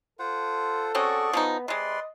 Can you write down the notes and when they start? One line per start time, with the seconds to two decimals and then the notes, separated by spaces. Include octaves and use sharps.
0.19 F4 A4 C5 F#5
0.95 C4 C#4 F#4 G#4 D5 C#6
1.33 F3 G#3 B3 D#4
1.68 C3 G#3 B4 D5 D#5 C6